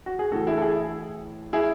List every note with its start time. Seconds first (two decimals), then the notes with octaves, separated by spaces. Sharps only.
0.06 F#4
0.19 G#4
0.32 A2 E3 F#4 A4
0.47 E4 G#4
0.58 A4
0.62 E4 G#4
1.53 E4 G#4